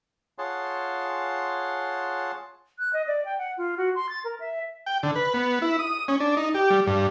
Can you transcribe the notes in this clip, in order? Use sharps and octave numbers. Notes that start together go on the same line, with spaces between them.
F4 G#4 C#5 F#5 A5 C6
F#6
D#5
D5
G5
F#5
F4
F#4
C6
A6
A#4
E5
G5
D3
B4
B3
E4
D#6
C#4
D4
D#4
G4
G3
G2